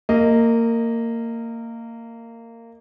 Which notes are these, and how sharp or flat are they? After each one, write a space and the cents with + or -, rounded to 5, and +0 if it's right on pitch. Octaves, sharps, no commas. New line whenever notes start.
A#3 -20 D#5 +0